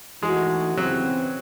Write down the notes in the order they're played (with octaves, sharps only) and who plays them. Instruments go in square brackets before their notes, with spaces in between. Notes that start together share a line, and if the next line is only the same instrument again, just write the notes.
[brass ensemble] E3 A3 D#4 F#4 [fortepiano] G#3
[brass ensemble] C#3 E3 C4 [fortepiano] F#3